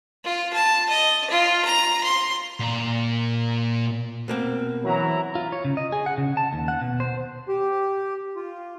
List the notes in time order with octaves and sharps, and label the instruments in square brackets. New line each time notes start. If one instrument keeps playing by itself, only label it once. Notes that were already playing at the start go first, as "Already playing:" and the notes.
[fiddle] F4
A5
D#5
F4
A#5
C6
[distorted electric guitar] A#2 A#5
[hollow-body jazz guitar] B2 A#3 C4
[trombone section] E3 F#3 [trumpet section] E4 A#5
[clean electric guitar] F4
C#5
C#3
D#5
G#4
F#5
C#3
A5
D#2
F#5
B2
C5
[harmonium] G4
F4